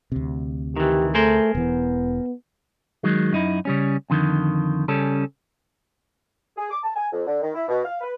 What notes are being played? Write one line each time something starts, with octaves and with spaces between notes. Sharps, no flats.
D2 C3
D#3 E3 G4
A3 G#4 A#4 C5
E1 E3 B3
D#3 F#3 G#3
F#2 D#4 E4
C#3 G3 C#4
F2 D3 D#3
C#3 G3 C#4 A4
G#4
D6
A5
G#5
F2
D3
D#3
E4
B2
F5
B4